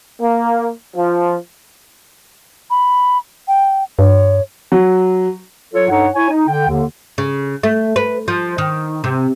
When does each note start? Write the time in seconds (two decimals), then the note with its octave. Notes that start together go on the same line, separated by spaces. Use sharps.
0.21 A#3
0.96 F3
2.70 B5
3.48 G5
3.99 G2 C#5
4.72 F#3
5.74 F#3 F4 A4 C#5
5.89 G2 D#4 A4 C#5 F#5
6.15 E4 C#5 G#5
6.30 D#4
6.48 D3 G5
6.68 D#2 D3
7.18 C#3
7.63 A3
7.96 B4
8.28 F3
8.58 D#3
9.04 C3